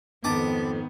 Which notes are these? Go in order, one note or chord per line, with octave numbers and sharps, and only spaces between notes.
F2 G#2 D#3 B3 A5 D6 D#6